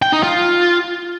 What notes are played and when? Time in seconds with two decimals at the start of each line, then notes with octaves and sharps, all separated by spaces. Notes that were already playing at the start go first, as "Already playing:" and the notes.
0.02 G5
0.12 D#4
0.23 F4